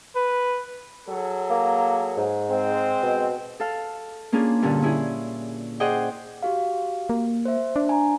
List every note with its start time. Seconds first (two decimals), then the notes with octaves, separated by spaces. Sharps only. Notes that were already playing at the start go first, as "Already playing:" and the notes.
0.16 B4
1.08 F#3 G#4 A4
1.50 A#3
2.17 G#2
2.50 G#3 C4
3.02 B2
3.60 A4 F5
4.32 A#3 C#4 D4 F4 G#4
4.62 G2 A#2 D3 C#4
4.82 C#4 E4 G#4
5.80 G#4 C5 D5 D#5 F#5 G5
6.43 F#4 G4 F5
7.10 A#3
7.45 C5 E5
7.76 D4
7.89 G#5 A#5